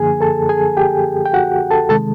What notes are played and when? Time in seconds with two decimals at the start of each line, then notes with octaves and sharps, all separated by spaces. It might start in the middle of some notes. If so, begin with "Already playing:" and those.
Already playing: F#2 D3 F3 A#3 G#4 G#5
0.21 A4 A5
0.49 G#4 G#5
0.77 G4 G5
1.26 G5
1.33 F#4 F#5
1.71 A4 A5
1.89 C3 D#3 G#3 A4 A5